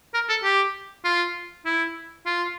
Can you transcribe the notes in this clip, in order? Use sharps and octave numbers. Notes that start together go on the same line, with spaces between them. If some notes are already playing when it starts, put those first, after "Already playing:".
A#4
A4
G4
F4
E4
F4